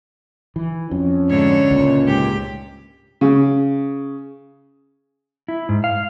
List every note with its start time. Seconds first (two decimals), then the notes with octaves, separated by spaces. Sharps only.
0.56 E3
0.91 F2 C#4
1.29 G#2 D3 C#5
1.71 C#2 A#2
2.05 G#2 G4
3.21 C#3
5.48 E4
5.69 G#2
5.84 F5